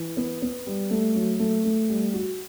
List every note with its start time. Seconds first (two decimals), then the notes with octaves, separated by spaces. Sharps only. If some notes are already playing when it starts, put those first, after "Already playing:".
Already playing: E3
0.17 B3
0.42 B3
0.67 G3
0.91 A3
1.15 F#3
1.39 A3
1.65 A3
1.90 G3
2.14 F#4